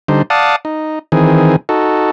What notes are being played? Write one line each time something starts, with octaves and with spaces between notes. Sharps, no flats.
D3 G3 D#4 C5
D5 F5 F#5 A5 D#6
D#4
D#3 E3 C4 G#4
D#4 F#4 A4